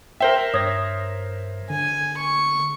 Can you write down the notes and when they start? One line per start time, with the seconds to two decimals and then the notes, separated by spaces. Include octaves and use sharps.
0.20 A#4 C5 E5 G5 G7
0.54 G2 C#5 D#6 G#6 A#6
1.70 D3 G#5
2.18 C#6